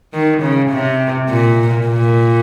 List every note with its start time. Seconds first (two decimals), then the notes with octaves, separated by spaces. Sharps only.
0.13 D#3
0.42 C#3
0.71 C3
1.29 A#2
1.87 A#2